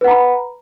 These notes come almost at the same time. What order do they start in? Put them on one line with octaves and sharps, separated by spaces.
B4 F#5 A#5 B5